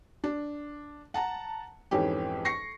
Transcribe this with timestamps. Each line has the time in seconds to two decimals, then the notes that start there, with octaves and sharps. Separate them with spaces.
0.24 D4
1.14 F#5 A5 A#5
1.91 F2 G#2 E3 C#4 G4
2.45 C#6 A#6 C7 C#7